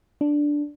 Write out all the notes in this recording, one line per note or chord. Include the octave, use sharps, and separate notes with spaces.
D4